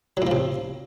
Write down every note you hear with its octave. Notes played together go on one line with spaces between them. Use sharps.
A2 C3 F3 F#3